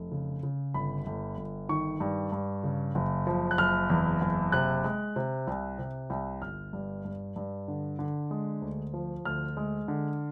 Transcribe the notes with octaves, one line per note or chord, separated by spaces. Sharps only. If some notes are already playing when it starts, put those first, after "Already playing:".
Already playing: F1
C#3
C#3
G1 B5
G1
G1
D#3 C#6
G2
G2
C#3
F#1
F3
F#6
F#1 F6
E2
F#1
C3 F#6
G#3
C3
C2
C3
C2
G1 F6
G2
G2
G2
D3
D3
G#3
D2
F3
D2 F6
G#3
D3